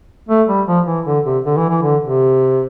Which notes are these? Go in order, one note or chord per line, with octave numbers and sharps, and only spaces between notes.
A3
G3
F3
E3
D3
C3
D3
E3
E3
D3
C3